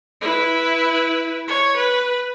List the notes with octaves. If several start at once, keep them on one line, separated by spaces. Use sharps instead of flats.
E4 B4
C#5
B4